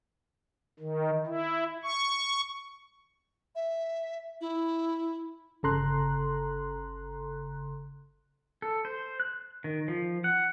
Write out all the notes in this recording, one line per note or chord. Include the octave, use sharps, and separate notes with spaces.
D#3
E4
C#6
E5
E4
G1 C#3 A4 A#5 C6 F#6
A4
C5
F#6
D#3
F3
F#5